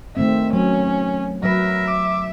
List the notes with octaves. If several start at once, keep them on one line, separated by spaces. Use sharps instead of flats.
D#3 A3 C4 E5
F#3 C#4
F#3 A#4 B4 E5
D6